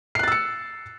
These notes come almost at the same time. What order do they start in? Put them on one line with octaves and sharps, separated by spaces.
C7 F#6 A6 E6 C#7